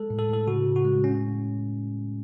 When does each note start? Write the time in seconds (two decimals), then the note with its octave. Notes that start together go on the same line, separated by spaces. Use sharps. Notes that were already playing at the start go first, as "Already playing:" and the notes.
Already playing: G#3 A4
0.10 A2
0.19 A4
0.29 A2 A4
0.47 C#3 F#4
0.66 C#3
0.76 F#4
0.85 G#3
1.04 A2 C#4